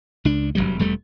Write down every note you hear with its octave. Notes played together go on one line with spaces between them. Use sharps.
C#2 D4
E1 E2 F#3 G3
E1 G3 A3